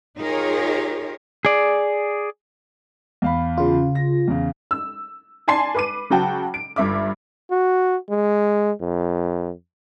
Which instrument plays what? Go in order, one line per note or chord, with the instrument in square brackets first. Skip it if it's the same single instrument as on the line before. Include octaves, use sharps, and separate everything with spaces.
[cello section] D#4 F4 G4 G#4 A#4 C#5
[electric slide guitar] G#4 D5
[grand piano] E2 F5 B5
[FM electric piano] C#3 F4
[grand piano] A#6
E2 C#3
[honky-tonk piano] E6
D5 G#5 A5 C6 C7
B4 D6 D#7
C#3 F#3 F#4 G5 A5
D7
G1 G2 E5 D6
[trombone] F#4
G#3
F2